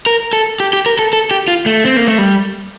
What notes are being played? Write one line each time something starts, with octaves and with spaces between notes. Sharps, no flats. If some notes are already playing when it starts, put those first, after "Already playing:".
A#4
A4
G4
G4
A#4
A4
A4
G4
F4
A3
C4
A#3
A3
G3